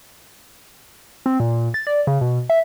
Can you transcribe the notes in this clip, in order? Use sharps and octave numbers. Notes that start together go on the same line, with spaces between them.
C4
A#2
A6
D5
C#3
B2
E5